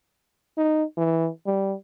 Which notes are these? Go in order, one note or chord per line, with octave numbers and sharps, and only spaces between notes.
D#4
E3
G3